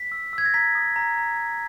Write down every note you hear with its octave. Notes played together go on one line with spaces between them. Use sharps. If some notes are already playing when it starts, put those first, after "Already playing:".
Already playing: B6
E6
E6 G#6
A#6
A#5 B6
D#6
A#5
A#5
A#5